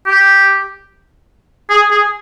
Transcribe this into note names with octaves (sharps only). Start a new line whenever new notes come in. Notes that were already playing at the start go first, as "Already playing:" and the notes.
G4
G#4
G#4